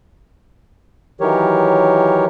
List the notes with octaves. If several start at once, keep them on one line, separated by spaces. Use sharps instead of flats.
D#3 E3 F#3 G4 A#4 C#5